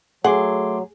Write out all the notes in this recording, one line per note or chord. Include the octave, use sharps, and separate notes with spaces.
F#3 A3 G#4 F#5 C6 D6